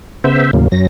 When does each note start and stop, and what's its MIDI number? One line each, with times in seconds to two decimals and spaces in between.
0.24 0.51 49
0.24 0.51 59
0.24 0.51 72
0.24 0.51 76
0.53 0.68 39
0.53 0.68 45
0.53 0.68 49
0.53 0.68 54
0.53 0.68 58
0.72 0.87 42
0.72 0.87 54
0.72 0.87 94